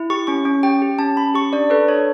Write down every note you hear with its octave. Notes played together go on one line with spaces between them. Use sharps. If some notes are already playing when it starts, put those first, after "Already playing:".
Already playing: E4
G4 C#6
C#4 C#6
C#4
G4 G5
G4
C#4 A5
C#4 B5
G4 C#6
D4 D5
A4 B4
D4 C#5